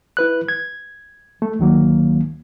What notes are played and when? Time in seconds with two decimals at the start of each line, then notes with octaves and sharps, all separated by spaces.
0.17 E4 B4 F#6
0.49 G#6
1.42 A3
1.59 D2 D#3 F#3 A#3